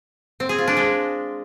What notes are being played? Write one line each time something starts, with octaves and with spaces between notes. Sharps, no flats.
C4
G#4
F4
D4
G#3